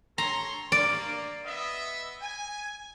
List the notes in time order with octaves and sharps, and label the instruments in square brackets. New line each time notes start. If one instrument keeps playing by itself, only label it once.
[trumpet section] A4 C#5 C6 [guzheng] A#5
[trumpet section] A#3 [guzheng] D5
[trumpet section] B3 D#5 E5
G#5